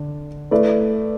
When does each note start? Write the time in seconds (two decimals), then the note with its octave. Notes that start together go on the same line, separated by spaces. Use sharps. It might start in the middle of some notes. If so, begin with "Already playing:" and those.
Already playing: D3 D4
0.51 A3 E4 B4 D5